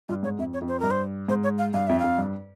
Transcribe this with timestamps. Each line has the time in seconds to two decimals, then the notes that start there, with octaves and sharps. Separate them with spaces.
0.09 G2 F4
0.23 G#2 C#5
0.39 F2 E5
0.54 C#5
0.62 F2
0.68 C5
0.80 G2 A#4
0.91 C5
1.28 G#2 C5
1.44 C#5
1.58 F5
1.74 G2 F5
1.87 F2 E5
2.00 F2 F5
2.18 G2